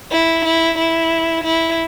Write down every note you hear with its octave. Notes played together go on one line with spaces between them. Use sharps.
E4
E4
E4
E4